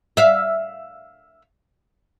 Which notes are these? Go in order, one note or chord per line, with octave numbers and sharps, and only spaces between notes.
E5 F5